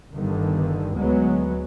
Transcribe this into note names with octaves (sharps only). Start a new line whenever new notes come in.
G1 G2 D3 D#3
D2 F#3 G#3 B3